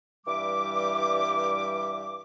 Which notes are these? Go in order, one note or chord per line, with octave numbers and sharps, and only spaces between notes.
G2 E3 G3 E5 D6